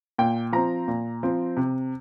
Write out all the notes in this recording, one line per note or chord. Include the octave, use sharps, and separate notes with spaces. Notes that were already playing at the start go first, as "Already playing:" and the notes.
A#2 G5
F3 C4 A#5
A#2
F3 C4
C3